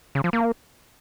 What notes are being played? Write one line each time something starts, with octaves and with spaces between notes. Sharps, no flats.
C#3
F3
A#3